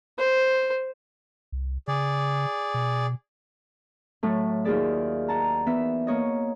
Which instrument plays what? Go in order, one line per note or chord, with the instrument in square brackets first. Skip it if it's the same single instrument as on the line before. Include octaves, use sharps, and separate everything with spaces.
[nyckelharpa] C5
[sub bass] C2
[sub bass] C#3 [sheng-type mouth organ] G#4 D5
[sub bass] B2
[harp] A2 F#3 A3
D#2 F4 F#4 G#4 D5 E5
F#5 A5 A#5
E3 B3 E4 E5
A#3 C#5 D#5